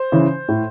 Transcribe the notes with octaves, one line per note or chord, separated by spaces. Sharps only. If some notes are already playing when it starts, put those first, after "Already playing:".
Already playing: C5
C#3 E3
A2